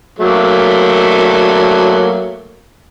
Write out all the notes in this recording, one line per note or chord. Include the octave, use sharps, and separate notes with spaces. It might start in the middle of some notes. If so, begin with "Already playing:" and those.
F#3 A3 A#3